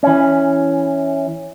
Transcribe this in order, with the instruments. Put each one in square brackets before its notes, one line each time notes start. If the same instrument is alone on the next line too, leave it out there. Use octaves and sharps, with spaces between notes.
[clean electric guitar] E3 C#4